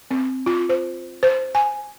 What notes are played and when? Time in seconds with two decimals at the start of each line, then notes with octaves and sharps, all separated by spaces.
0.11 C4
0.46 F4
0.69 C5
1.23 C5
1.55 G#5